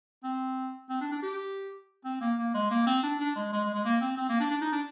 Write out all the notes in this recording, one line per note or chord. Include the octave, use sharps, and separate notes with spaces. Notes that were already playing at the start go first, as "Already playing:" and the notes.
C4
C4
D4
D4
G4
C4
A#3
A#3
G#3
A#3
C4
D4
D4
G#3
G#3
G#3
G#3
A#3
C4
C4
A#3
D4
D4
D#4
D4